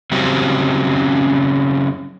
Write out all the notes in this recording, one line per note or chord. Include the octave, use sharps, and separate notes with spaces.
C#3 F#3 G3 C4 C#4